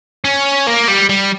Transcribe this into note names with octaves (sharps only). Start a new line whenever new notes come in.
C#4
A#3
G3
G3